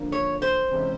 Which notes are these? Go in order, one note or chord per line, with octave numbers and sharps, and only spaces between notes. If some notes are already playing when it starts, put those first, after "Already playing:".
Already playing: D3 F3 A#3 D4
C#5
C5
C3 E3 G#3 C#4 E4